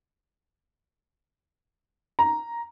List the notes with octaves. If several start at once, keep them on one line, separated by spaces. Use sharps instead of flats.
A#5